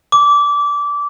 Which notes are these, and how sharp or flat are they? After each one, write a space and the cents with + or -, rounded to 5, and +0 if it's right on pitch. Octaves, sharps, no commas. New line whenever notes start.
D6 -20